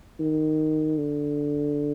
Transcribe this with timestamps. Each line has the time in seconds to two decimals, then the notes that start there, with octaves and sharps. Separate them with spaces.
0.20 D#3
0.98 D3